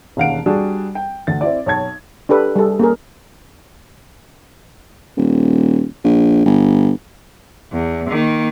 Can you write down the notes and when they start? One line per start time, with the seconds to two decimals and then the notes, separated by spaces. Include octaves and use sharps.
0.17 E1 D#2 C#4 F5 F#5 D7
0.46 G3 D4 F#4 G#4
0.95 G5
1.27 D2 A6
1.41 C4 E4 D5
1.66 B1 C#5 A5 G#6
2.29 D4 G4 A4 B4
2.56 G3 G#4 A4
2.79 A#3 C#4 G#4 A#4
5.17 D#1
6.04 A#1
6.46 G1
7.73 E2
8.10 D#3 A#3